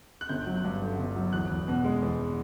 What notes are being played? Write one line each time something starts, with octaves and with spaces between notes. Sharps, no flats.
F#6
G1 G6
F#3
G2
D3
G1
F#3
E2 F#6
E2
B2
G#3
E2